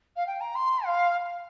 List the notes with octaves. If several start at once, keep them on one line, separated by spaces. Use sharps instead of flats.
F5
G5
A#5
C6
F5